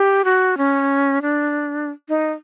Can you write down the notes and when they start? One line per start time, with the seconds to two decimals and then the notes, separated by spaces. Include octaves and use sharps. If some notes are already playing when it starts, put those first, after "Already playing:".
Already playing: G4
0.25 F#4
0.58 C#4
1.22 D4
2.09 D#4